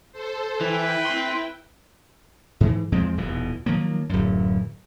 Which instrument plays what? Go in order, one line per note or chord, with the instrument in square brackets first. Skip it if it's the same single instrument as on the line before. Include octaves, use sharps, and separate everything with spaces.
[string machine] A4 C5
[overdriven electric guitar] E3 [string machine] E4 G5 [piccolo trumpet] B4
[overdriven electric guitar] C4 C6
[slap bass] G#2 E3
E2 F3 G#3 C4
D#1 B2 E3
D#3 F3 F#3 A#3
D1 F#2